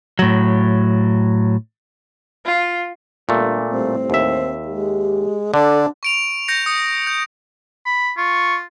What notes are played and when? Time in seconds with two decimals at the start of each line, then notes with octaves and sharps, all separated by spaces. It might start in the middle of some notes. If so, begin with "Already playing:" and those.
0.19 A2 F#3
2.46 F4
3.29 G1 A#2 A3
3.70 G1 A2 G3 C4
4.10 D#2 E5
4.66 G#3 G4
5.54 D3 D4 A4
6.03 C#6 D7 F7
6.48 G6 A#6 C#7
6.66 D#6 C#7
7.07 G6
7.86 B5
8.18 F4 C#6